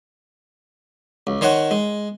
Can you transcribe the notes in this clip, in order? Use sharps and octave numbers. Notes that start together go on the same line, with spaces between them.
C#2
D#3 C5 C#5 D#5 F#5
G#3